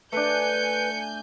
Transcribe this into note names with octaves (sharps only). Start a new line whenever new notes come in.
A3 D4 B4 G#5 G6 C#7